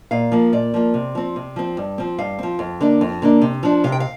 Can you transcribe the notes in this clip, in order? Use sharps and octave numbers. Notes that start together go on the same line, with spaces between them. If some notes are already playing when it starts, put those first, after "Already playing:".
A#2 F5
F3 A#3
A#2 D5
F3 A#3
C3
F3 C4
C3
F3 C4
G2
F3 C4
G2 F5
F3 C4
F2
D3 A#3 D4
F2
D3 A#3 D4
C3
F3 D4
C3 F5
G5
F5